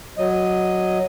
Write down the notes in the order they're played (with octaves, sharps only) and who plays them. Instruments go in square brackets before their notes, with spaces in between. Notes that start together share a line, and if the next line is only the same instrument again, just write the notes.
[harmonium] F#3 D#5